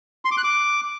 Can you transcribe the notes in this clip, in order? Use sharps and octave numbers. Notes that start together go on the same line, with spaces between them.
C6
D6
F#6
D6